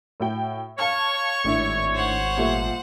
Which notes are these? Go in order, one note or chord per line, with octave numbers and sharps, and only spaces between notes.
A2 F#4 G5
C#5 F5 A5 C#6 F6
G#1 A2 D4 E4
C5 F#5
A#2 G3 A3